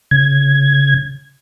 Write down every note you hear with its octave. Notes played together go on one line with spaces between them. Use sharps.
C#3 G#6